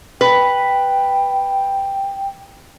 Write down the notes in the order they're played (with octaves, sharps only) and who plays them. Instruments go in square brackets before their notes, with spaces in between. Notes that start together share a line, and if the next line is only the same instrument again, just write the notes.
[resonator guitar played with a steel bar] B4 [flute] G5